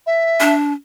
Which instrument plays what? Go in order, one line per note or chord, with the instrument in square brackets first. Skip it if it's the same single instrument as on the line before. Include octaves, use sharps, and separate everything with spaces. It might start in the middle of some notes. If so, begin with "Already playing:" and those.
[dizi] E5
[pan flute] D4